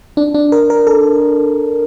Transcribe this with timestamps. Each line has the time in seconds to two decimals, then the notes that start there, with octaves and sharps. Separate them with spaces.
0.17 D4
0.34 D4
0.52 A#4
0.70 A#4
0.87 A4